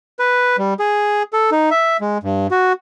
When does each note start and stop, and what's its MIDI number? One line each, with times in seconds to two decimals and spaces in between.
0.19 0.56 71
0.58 0.74 55
0.79 1.23 68
1.33 1.50 69
1.52 1.70 63
1.71 1.97 76
2.01 2.18 56
2.23 2.47 43
2.51 2.73 66